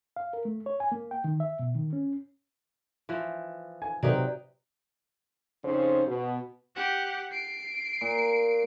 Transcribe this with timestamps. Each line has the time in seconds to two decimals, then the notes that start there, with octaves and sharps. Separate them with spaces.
0.16 F5
0.33 A#4
0.45 A3
0.66 C#5
0.80 G#5
0.92 A#3
1.11 G5
1.24 D#3
1.40 E5
1.59 B2
1.75 D#3
1.93 C#4
3.09 E3 F3
3.82 G#5
4.03 C3 F#3 D#4 G4 B4 C5 D5
5.64 F2 C#3 D#4 C5
6.07 B2
6.76 G4 F#5
7.32 C7 D7
8.01 A#2